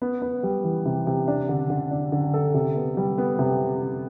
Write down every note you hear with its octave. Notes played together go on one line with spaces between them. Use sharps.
B3
B3
G3
E3
C3
C3
D4
D3
D3
D4
D3
A4
C3
B3
G3
B3
C3